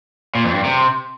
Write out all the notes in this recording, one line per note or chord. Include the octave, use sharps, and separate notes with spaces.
A#2
F2
G2
C3